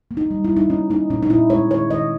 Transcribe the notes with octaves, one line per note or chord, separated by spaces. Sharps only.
A#3
D#4
G3
E4
G3
D#4
A#3 C#4
A#3 D#4
A#2 C#4
D#4
A#2 E4
G#3 C#5
D#3 C#5
D#3 D#5